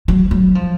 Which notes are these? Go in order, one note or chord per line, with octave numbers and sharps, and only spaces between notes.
F#3
F#3
F3